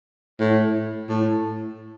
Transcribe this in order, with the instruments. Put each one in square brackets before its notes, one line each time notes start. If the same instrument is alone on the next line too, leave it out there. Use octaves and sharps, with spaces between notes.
[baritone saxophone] A2
A2